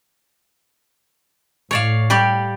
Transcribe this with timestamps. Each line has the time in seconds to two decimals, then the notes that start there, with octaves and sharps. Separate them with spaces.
1.71 A2 C#5 D5 F5
2.10 G3 G4 D5